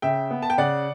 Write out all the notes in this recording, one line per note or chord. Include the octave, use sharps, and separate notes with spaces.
C#3 E5 G5
B3
A5
G5
C#3 D5 F#5